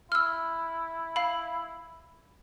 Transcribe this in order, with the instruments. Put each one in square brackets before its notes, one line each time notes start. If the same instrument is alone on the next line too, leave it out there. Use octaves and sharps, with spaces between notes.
[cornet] E4 [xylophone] E6 F6
[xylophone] F5 B5